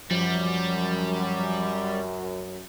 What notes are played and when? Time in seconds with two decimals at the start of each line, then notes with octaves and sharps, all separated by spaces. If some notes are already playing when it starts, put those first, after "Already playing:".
0.11 F#2 F3 G3